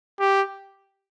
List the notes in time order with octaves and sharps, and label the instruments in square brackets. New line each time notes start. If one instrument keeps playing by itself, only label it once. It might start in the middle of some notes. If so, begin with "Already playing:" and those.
[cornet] G4